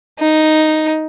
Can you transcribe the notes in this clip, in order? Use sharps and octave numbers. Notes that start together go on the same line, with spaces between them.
D#4